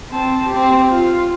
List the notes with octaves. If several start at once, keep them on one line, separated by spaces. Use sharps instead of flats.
C4 A5
C4 G4
F4